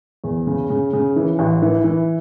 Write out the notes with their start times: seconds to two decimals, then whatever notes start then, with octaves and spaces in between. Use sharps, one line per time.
0.24 E2
0.47 C#3
0.70 C#3
0.93 C#3
1.16 E3
1.39 A1
1.62 E3
1.84 E3